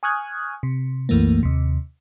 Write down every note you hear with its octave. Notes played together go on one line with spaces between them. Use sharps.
G#5 C#6 D#6 F6 F#6 G#6
C3
C2 F#2 E3 A3 A#3
D#2 C3